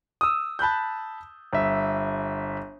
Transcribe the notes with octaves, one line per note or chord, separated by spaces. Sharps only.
D#6 E6
A5 B5 F#6 G6
G1 E5